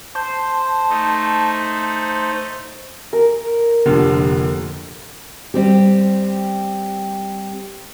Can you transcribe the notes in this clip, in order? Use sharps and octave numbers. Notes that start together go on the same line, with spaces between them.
C5 A5
A3 D#4
A#4
F1 A#2 D3
G3 C4 G4